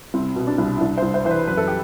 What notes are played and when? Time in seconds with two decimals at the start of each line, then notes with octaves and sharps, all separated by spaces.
0.14 C2 C4
0.36 B2
0.47 D4
0.58 C2
0.77 E4
0.81 C2 D4
0.98 C2 C5
1.14 C5
1.25 E3 C5
1.31 B4
1.48 F#2 B4
1.57 A4
1.67 G4